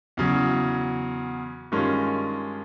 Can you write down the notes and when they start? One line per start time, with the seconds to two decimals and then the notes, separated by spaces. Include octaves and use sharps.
0.17 E2 C#3 F#3
1.72 G2 D#3 G#3 C#4 F4